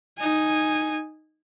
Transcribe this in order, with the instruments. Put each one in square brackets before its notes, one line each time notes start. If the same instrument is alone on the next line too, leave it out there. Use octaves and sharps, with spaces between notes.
[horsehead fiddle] D#4 G#5